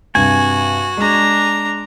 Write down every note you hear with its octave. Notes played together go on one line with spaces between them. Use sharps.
G2 C3 F#4 G#5
G#3 D4 A#5